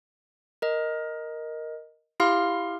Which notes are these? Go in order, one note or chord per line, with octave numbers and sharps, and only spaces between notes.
A#4 D#5
E4 G4 F5 C6 F6